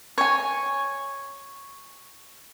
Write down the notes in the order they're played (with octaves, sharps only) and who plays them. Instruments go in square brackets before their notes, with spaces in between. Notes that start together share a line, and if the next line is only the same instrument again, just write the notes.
[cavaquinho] C#5 G#5